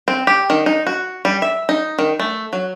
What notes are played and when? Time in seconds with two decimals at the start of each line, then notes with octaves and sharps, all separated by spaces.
0.08 C4
0.27 G4
0.50 D#3
0.66 D#4
0.87 F#4
1.25 G3
1.42 E5
1.69 D#4
1.99 D#3
2.20 A3
2.53 F#3